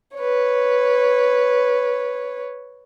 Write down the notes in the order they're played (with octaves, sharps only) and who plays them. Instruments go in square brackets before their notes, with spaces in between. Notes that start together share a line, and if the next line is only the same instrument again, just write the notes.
[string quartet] B4 C#5